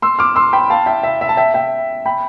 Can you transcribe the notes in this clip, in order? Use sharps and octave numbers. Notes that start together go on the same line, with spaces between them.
C6 E6
D6 F6
C6 E6
G5 B5
F5 A5
E5 G5
E5
E5
A5
E5 G5
E5 G5
G5 B5